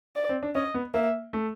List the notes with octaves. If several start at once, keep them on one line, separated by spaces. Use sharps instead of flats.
D5
C4
D4
C#4 D#5
B3
A#3 E5
A3